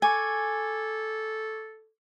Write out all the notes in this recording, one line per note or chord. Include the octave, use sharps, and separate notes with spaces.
A4 G#5 C#6 D6 G#6